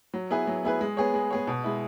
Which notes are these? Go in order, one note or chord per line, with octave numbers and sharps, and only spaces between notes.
F#3
B3 E4 G#4 B4
F#3
B3 E4 G#4 B4
G#3
B3 G#4 C#5
G#3
B3 G#4 C#5
B2
G#3 E4